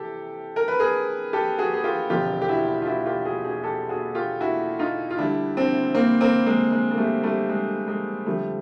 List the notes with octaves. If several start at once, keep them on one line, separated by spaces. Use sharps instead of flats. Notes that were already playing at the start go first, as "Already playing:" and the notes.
Already playing: C3 E3 G4 A4
A#4
B4
G#4 A#4
G4 A4
F#4 G#4
G#4
F4 G4
E1 D2 C3 F3 F4 G4
G4
E4 F#4
F4
E4 F#4
F4 G4
F#4 G#4
F#4 G#4
G4 A4
F#4 G#4
F4 G4
E4 F#4
D#4 F4
F4
D2 D3 G3 D4 E4
C4 D4
A#3 C4
A#3 C4
G#3 A#3
G#3
A#3
G3 A3
G3 A3
G#3
G#3
F2 D3 F3 G3 A3